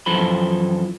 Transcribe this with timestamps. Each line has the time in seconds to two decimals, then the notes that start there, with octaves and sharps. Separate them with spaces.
0.06 F#2 E3 F3 A4 C5 B5